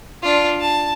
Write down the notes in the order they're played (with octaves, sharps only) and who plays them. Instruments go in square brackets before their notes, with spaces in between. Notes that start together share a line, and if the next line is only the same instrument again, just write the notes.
[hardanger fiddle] D4 F4
A5